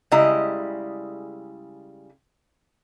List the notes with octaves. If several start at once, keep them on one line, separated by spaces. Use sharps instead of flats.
C#3 G3 G#3 E4 D#5 A#5